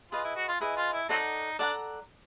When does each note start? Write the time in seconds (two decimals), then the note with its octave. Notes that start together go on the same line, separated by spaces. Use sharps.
0.11 F4 G#4 B4 D#5
0.24 E4
0.36 F#4
0.48 F4
0.61 E4 G#4 B4 D#5
0.77 F4
0.93 E4
1.09 F#3 C4 D#4 A4 D5 F#5 A#5
1.59 D4 A4 D5 F#5 A#5